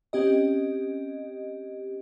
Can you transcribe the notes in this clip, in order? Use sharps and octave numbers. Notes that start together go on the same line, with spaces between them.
C4 C#4 G4 D#5